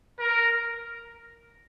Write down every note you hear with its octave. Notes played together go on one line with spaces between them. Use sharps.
A#4